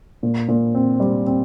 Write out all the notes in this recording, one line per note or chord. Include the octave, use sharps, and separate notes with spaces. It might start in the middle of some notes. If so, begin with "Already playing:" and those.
A#2
A#2
C4
G3
C4